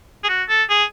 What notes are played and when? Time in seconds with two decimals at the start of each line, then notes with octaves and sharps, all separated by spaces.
0.24 G#4
0.29 F#4
0.49 A4
0.70 G#4